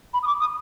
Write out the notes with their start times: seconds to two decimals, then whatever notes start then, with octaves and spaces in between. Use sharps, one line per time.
0.13 B5
0.23 D#6
0.27 D6
0.40 D#6